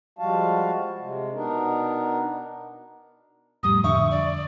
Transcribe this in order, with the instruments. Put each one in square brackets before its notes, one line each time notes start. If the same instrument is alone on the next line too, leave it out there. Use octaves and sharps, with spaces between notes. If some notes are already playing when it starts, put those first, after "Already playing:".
[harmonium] F3 G3 G#3 F#4 F5 A5
C3 G#3
B2 B3 D4 D#4 A#4
[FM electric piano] F2 A2 G3 [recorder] D#6
[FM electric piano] F2 D3 E5 [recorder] C#6
[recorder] D5